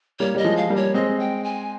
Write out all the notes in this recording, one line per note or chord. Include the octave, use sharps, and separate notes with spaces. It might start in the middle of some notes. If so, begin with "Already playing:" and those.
G3 A#3 C#5
G3 D#5
F3 G#3
F5
G3 A#3
C#5
G#3 C4 D#5
G5
G#5